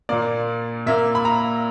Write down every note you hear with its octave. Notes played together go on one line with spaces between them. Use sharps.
A#2 A#3 D5
A#2 A#3 E5
B5
A#5